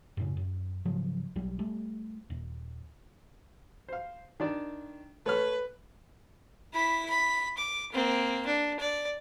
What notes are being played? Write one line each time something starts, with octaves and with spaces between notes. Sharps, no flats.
F#2 A2 C#3
F#2
G#2 C#3 F3 F#3
B1 F#3 G3
G3 A3
D#1
C5 F5
D#3 D4 D5
A3 B4 C#5 F6
E4 B5
B5
D6
A#3 C4
D4
D5